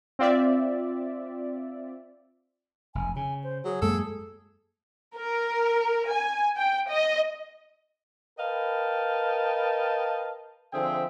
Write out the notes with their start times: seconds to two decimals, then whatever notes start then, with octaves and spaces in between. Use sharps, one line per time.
0.19 C4 F4 D5 E5
2.95 F1 G#5
3.16 C#3 G#5
3.44 C5
3.64 F#3 G#4
3.82 F#2 G#3 A#3 A4
5.17 A#4
6.09 G#5
6.57 G5
6.89 D#5
8.39 A#4 B4 D#5 F5 G5 A5
10.73 D3 F3 C4 G#4 E5 G5